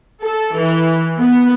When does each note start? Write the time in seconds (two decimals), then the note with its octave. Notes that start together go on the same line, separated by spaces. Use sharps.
0.22 A4
0.56 E3
1.18 B3